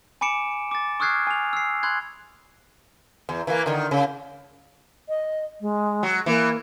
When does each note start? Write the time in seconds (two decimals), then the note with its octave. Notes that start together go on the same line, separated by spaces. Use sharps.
0.21 G#5 B5 D6 C#7 D7 E7
0.71 D6 A6
1.00 C#6 D#6 F6 F#6 G#6 C7
1.27 G#5 F7
1.53 E6 C7
1.83 B5 C6 F#6 G#6
3.29 E2
3.47 E3 A#3
3.66 D3 D#3
3.91 C#3
5.09 D#5
5.61 G#3
6.03 F#3
6.26 E3 A#3